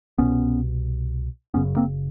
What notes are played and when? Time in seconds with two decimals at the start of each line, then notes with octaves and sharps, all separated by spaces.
0.18 C2 B2 B3 C#4
1.54 F#1 F#2 C#3 B3 C#4
1.77 A#3 C4